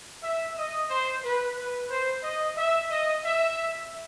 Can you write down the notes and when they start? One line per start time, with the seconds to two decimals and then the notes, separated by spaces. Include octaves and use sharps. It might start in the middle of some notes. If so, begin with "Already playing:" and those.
0.22 E5
0.56 D#5
0.89 C5
1.23 B4
1.56 B4
1.89 C5
2.23 D#5
2.57 E5
2.90 D#5
3.24 E5